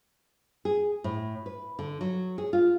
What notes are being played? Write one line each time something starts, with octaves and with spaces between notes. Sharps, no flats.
G#4
A2
B4
D3
F#3
G#4
F4